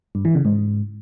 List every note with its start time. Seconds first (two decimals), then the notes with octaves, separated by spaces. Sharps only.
0.15 G2
0.25 E3
0.35 C#3
0.45 G#2